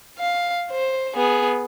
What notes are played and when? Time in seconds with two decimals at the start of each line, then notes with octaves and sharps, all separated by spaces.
0.19 F5
0.71 C5
1.15 B3 G#4